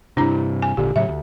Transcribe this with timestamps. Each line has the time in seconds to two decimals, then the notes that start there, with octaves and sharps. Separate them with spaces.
0.17 G2 C3 D4 E4 A#5
0.62 G#5
0.77 G#1 A#2 D3 G4
0.96 A2 C#3 F#3 E5
1.09 D2